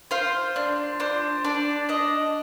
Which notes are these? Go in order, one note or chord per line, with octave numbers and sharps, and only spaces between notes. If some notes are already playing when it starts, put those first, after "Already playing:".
F4 C5
D4
D4 C5
D4 D5
D4 D#5